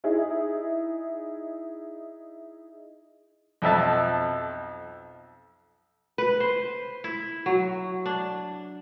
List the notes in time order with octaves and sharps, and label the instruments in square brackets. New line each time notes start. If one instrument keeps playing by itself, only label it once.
[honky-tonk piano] D#4 E4 G#4
[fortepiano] B1 F2 E5 A5
[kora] B4
C5
E4
F#3
D4